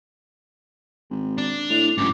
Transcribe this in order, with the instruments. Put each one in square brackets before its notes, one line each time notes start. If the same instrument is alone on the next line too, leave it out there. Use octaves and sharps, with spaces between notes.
[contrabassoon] G#1
[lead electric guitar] D4
[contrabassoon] A2 [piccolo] F7
[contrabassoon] A1 [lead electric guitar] G#2 F#3 [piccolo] D6